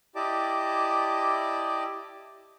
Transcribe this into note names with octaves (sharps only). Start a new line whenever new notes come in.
E4 G4 D5 D#5 A5 D6